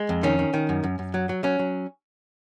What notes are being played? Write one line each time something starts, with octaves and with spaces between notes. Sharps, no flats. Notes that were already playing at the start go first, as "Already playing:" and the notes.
Already playing: G#3
F2
D#3 C#4
D#3
D#3
F#2
F#2
F#2
F#3
F#3
F#3 C#4
F#3